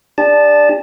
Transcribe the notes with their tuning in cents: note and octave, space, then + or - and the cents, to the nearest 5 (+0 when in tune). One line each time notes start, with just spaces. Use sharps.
D4 +0 G4 +45 A5 -10